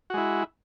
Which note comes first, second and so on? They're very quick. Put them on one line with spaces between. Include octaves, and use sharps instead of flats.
F#4 G#3 E4